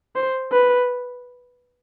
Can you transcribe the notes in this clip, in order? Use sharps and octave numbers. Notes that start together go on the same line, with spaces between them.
C5
B4